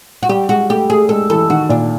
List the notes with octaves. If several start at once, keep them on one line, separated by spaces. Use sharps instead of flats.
F#4
G3 G4
G#3 F#4
A3 G4
A3 G#4
G#3 A4
E3 A4
D#3 F#4
A#2 D4